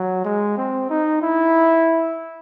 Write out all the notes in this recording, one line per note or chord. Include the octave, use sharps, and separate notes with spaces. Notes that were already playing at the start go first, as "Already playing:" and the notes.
Already playing: F#3
G#3
C4
D#4
E4